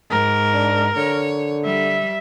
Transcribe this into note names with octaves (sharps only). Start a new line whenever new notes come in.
G#2 A#4
D4
D3 C#5
G3 E5